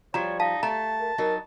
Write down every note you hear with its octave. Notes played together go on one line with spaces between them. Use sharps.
F3 G3 F#4 C#5 A#5
D#4 F5 A5
A3 A5 A#5
A#4
F#3 D#4 A#4